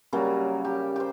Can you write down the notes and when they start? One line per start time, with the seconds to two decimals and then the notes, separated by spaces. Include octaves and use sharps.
0.13 C#3 F#3 G3 A#3
0.65 G4
0.96 G4 C5